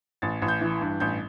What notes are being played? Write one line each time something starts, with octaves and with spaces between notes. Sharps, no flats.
A1 A6
A1
G6
E3
G2
A1 G6